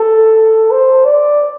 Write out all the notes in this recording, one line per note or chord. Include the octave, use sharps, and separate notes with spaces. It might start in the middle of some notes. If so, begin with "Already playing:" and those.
Already playing: A4
C5
D5